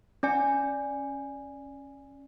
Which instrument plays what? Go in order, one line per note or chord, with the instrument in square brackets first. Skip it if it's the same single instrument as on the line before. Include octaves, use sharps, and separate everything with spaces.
[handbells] C#4 D5 G#5